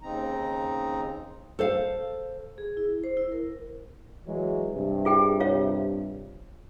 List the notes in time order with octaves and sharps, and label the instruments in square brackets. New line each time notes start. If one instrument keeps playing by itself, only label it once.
[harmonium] D#2 C#3 C4 D#4 A#5
[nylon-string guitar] A4 C5 F5
[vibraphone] G#4
E4
C5
E4
A#4
[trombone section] E3 F#3 G#3
G2 C3
[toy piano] F4 G#4 G5
F4 C#5 F5